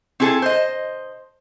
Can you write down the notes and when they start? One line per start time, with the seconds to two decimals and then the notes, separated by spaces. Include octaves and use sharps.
0.20 C4 E4 G#4 A4
0.42 C5 D#5